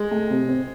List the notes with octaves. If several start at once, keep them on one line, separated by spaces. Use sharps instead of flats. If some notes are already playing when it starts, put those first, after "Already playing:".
Already playing: G#3
A3
C3
C4